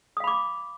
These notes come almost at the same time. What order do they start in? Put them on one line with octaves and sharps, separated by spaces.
D#6 F5 B5 D6